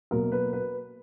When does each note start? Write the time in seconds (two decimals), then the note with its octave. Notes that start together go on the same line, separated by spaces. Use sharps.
0.11 B2 F#3 A#3 A#4
0.32 B4
0.53 B4